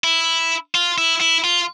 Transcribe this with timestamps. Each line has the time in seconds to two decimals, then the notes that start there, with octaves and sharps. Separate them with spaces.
0.04 E4
0.75 F4
0.98 E4
1.21 E4
1.44 F4